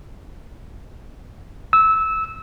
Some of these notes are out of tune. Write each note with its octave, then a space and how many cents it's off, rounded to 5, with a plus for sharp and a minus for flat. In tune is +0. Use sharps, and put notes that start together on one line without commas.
E6 -20